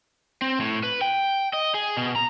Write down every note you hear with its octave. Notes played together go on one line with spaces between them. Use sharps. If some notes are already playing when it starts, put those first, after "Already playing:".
C4
A2
B4
G5
D#5
G#4
B2
A#5